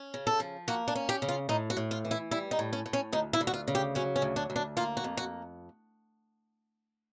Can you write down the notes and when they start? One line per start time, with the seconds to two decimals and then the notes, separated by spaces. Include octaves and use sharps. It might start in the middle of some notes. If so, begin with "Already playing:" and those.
Already playing: C#4
0.14 C#3
0.27 A4
0.40 F3
0.68 A#3 F#4
0.88 D4
0.95 C#4
1.09 G4
1.22 C#3
1.28 F4
1.49 A2 D#4
1.70 F#4
1.77 A2
1.91 F4
2.05 E3
2.11 E4
2.31 G3 E4
2.51 D#4
2.59 A2
2.73 C#4
2.86 A2
2.93 C#4
3.12 D2 D#4
3.33 E4
3.41 D2
3.47 F#4
3.54 F4
3.68 C#3
3.75 G4
3.95 F#3 C#4
4.16 C#4
4.22 D2
4.36 D4
4.50 D2
4.56 D4
4.77 A#3 F4
4.97 F#4
5.04 F2
5.17 F#4